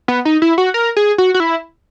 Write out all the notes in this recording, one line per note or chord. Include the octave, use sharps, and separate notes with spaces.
B3
D#4
E4
F#4
A#4
G#4
F#4
F#4
E4